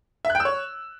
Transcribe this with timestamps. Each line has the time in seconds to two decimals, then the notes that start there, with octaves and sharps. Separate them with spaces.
0.25 E5
0.30 F#6
0.35 G5
0.40 E6
0.45 C#5